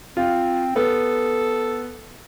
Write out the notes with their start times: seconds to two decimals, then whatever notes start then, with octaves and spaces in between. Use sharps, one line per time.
0.17 C4 F4
0.76 B3 A4